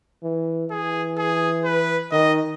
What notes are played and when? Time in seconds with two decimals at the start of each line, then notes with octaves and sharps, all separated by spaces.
0.23 E3
0.71 E3 G#4
1.18 G#4
1.65 B4
2.12 D#3 D#5